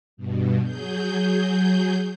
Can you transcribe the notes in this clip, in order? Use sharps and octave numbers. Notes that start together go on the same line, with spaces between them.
G2 B2
F#3 G#4 G6